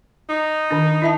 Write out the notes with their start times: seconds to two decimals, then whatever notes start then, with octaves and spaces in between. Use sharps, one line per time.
0.29 D#4
0.71 D#3 D4
1.02 E4 E5 A5